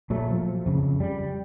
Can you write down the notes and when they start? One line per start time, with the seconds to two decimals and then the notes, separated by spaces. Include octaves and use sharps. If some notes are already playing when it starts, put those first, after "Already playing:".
0.10 A#2 F#3 A3
0.31 F3
0.66 F2 C#3
1.00 G3